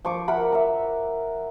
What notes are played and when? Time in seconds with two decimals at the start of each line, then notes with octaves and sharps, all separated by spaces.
0.05 F3 C#6 D6
0.28 A#4 E5 F#5 B5
0.52 A#4 E5